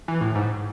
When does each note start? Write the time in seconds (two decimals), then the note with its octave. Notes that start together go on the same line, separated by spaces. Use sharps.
0.08 E3
0.21 A2
0.35 G#2